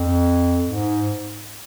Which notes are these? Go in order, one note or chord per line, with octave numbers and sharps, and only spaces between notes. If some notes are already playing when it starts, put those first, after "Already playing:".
Already playing: F2
G#2